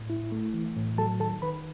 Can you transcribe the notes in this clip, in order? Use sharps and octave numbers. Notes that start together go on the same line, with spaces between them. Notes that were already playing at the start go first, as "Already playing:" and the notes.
Already playing: A2
E4
A3
E3
A2
F#3 A4 A5
D#3 A4 A5
D#3 B4 B5